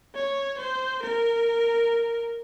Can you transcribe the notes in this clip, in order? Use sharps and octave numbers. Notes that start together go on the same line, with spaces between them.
C#5
C5
A#4